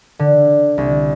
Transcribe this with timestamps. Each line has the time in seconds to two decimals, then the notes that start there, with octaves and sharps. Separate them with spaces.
0.19 D3
0.78 C2